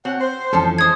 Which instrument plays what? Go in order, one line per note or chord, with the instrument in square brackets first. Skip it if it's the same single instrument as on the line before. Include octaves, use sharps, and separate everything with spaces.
[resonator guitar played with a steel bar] C4 [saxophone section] C#4 F#5
[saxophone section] C5
[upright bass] F2 E3 [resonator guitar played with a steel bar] F3 C#4 A4
[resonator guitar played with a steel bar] G#3 C5 [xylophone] D#6 G#6